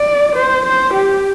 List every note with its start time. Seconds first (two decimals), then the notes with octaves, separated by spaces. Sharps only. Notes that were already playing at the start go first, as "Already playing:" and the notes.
Already playing: D5
0.35 C5
0.65 C5
0.94 G4